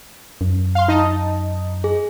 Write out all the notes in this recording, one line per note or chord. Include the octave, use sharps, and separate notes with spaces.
F#2
F5 C6
D#4 D#5 A5
G#4